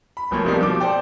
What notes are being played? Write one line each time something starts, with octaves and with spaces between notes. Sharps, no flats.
B5
D1 F3 A3 A#3
C3 F3 G3 A#3 D#4 G4
B2 F3 F#3 D6
A4 C5 D5 G5